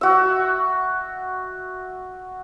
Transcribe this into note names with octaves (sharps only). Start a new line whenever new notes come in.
F#4 E5